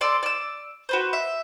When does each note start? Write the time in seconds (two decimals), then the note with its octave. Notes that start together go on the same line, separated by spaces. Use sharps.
0.01 A4 D5 C6
0.23 D5 E6
0.89 F#4 B4 C5
1.13 E5